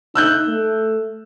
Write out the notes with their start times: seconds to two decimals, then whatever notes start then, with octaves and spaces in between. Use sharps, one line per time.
0.15 D#4 E6 F#6 G6
0.47 A3